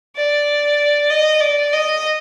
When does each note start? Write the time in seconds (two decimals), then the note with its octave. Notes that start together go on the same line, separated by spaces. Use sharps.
0.16 D5
1.10 D#5
1.40 D5
1.72 D#5